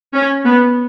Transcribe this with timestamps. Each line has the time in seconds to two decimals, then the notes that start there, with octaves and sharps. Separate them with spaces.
0.14 C#4
0.46 B3